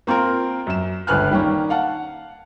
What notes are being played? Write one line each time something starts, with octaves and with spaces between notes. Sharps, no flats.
A#3 C4 F4 A#4
F#2 E7
G1 C#2 B4 G#5 F6 F#6
D#3 G3 A#3 C#4
F5 F#5 A5